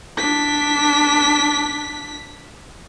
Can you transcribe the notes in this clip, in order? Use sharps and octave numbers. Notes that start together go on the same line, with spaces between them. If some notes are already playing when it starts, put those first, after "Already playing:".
D4 B6